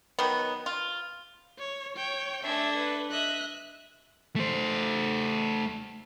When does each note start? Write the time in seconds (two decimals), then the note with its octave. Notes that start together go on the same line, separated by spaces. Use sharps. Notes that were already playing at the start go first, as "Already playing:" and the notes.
0.19 D#3 F#3 B3
0.66 F4
1.59 C#5
1.96 C#5 G5
2.43 A3 D4 E5 G#6
2.78 B4
3.11 D#5 E5 F#6
4.36 A3 C5